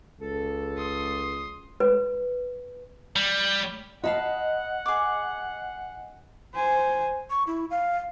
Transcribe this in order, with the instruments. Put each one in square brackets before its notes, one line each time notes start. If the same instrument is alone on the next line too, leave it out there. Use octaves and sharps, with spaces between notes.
[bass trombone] C#2 [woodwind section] A4
[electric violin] C6 D#6
[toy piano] B4
[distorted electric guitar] G3
[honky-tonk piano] D#5 [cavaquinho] F5 A5 B5 [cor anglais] F#5
[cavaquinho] G#4 D6
[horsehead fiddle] C5 G#5
[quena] C#6
E4
F5